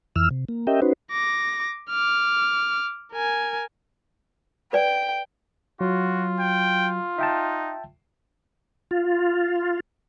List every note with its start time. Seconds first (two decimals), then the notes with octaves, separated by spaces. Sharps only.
0.16 F2 E3 E6 F6
0.31 C3
0.49 A#3
0.67 C#4 G4 A#4 D#5 E5 G5
0.82 C#4 D#4 F#4 B4 C5
1.12 D6 A#6
1.90 D6 F6
3.13 A#4 G#5
4.73 B4 D5 G5
5.81 F#3 F4 F#4
6.40 G5
7.19 D#4 E5 G5 A5
8.91 F4